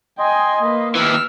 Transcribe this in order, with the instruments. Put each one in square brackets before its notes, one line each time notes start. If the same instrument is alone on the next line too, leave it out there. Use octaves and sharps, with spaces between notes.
[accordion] D#5 C6 [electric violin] G5 G#5
[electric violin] A#3 B4
[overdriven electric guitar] D#2 E3 [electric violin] E6 F6